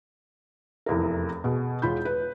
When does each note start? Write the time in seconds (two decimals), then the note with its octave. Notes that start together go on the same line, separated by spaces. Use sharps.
0.86 F1 E2 A#4
1.44 B2 G#4
1.82 E1 F4 B5 G6
2.05 B4